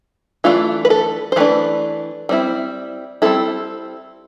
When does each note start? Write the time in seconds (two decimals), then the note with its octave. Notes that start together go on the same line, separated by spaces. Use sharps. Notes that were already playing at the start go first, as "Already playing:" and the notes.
0.44 E3 A3 D4 F4
0.85 B4
0.90 A4
1.32 C5
1.36 E3 A3 D4 B4
2.29 G3 C4 E4
3.22 G3 C4 E4 A4